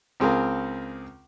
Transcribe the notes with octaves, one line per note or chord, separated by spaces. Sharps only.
C#2 C4 G#4 A#4 F5